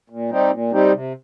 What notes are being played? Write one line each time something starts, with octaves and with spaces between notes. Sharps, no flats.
A#2
G3 C4 D#4 G4
A#2
G3 C4 D#4 G4
C3